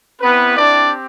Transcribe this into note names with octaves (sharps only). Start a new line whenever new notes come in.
B3 C4 E4 G4 B4
D4 D5